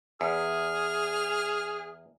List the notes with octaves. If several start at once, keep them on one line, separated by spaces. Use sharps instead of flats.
E2 G#4 F6